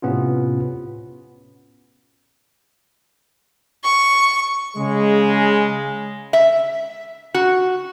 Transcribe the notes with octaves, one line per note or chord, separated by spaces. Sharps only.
A2 C3 B3 C#4 F4
C#6
C#3 G#3
E5
F#4